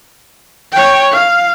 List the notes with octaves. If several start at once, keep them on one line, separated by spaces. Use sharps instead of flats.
C#5 G5
F5